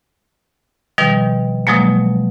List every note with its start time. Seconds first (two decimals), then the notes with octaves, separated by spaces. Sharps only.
0.98 B2 D#3 F3 G3
1.67 B2 F3 F#3 G#3 A#3